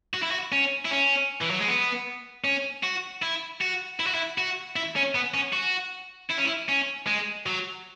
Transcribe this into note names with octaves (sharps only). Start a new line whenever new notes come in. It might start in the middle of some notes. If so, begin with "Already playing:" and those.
F#4
E4
F#4
C#4
E4
C#4
E3
F#3
G#3
B3
C#4
F#4
E4
F#4
E4
F#4
E4
F#4
E4
C#4
B3
C#4
F#4
E4
C#4
E4
C#4
G#3
F#3